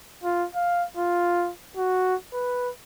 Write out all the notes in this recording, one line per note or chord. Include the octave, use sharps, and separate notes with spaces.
F4
F5
F4
F#4
B4